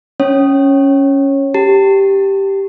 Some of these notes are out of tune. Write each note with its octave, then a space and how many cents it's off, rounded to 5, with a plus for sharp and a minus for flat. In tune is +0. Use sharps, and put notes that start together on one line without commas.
C#4 +0 C#5 -20
G4 -5 A5 +30